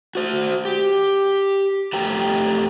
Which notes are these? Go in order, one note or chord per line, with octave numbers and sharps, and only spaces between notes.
F#4 C5
G4
F2 A3 G4 G5 A#5